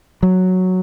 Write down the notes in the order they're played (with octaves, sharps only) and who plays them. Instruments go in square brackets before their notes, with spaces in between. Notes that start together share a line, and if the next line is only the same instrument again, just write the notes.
[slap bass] F#3